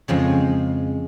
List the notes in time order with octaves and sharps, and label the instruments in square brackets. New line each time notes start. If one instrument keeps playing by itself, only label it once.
[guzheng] F2 C#3 F3 G#3